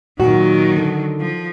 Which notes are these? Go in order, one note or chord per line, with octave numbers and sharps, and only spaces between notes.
A#2 D#3 F#3 F#4
D3
F3